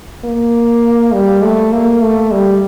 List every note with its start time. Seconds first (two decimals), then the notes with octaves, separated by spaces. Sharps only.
0.25 A#3
1.13 G3
1.43 A3
1.73 A#3
2.02 A3
2.32 G3